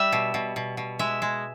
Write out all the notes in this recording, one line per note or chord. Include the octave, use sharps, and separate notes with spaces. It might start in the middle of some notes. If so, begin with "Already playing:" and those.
Already playing: G3 E5
B2
B2
B2
B2
G#3 E5
G#3